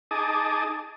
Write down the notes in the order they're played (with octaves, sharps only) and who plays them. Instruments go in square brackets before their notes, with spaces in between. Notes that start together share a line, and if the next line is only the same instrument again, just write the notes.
[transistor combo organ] D#4 G#4 A5 D6 D#6